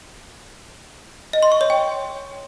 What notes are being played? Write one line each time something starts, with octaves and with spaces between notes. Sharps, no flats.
D#5
C6
C#6
C#5
G5